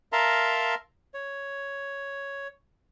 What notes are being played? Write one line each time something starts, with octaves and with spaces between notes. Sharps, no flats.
A#4 E5 F5 A5 A#5 C6
C#5